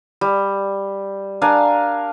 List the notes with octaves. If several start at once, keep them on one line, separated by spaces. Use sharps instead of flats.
G3
D4 A#4 F5 G#5